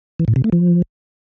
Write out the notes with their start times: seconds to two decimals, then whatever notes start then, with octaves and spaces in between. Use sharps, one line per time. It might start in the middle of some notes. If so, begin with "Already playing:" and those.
0.19 E3
0.28 A2
0.36 C3
0.44 A3
0.52 F3